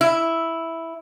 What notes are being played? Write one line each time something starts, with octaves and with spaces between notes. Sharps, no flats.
E4